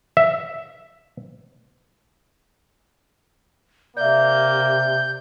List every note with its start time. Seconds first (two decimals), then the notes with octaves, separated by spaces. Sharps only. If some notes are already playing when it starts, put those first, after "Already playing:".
0.17 E5
3.97 C3 A#3 D5 E5 G6